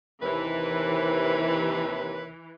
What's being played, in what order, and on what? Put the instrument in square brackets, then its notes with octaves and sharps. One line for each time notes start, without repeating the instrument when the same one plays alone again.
[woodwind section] D#2 C3 [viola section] E3 [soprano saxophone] B4